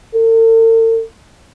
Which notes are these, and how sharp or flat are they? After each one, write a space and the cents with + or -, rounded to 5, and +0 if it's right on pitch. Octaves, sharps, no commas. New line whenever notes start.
A4 +45